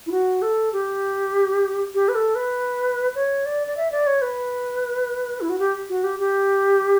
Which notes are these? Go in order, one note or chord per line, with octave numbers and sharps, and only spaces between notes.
E4
F#4
A4
G4
G4
B4
A4
B4
C#5
D5
D5
E5
D5
C#5
B4
E4
F#4
G4
F#4
G4
G4